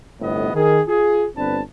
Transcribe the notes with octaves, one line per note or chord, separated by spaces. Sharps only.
G1 A2 C3 B3 D#5
D#3 G#4
F4 G#4
G1 C4 D4 B4 A5